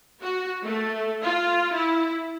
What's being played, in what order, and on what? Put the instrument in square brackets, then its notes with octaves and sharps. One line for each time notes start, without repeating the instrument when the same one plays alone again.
[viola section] F#4
A3
F4
E4